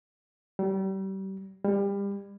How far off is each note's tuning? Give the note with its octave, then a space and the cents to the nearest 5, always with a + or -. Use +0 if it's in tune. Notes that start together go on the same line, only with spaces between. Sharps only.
G3 -35
G3 +25